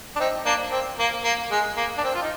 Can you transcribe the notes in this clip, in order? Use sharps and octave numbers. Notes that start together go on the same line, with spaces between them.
D4
C4 D#4
A#3 D4
C4
A#3
A#3
G#3
A#3
D4
C4
F4
D#4